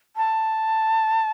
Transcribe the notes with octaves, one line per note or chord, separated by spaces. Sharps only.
A5